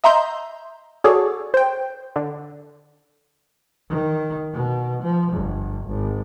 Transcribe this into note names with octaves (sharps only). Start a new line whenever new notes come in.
D#5 E5 A#5 C6 G6
F#4 G#4 A4 C#5 D5
C5 G5
D3
D#3
B2
F3
G1
G#1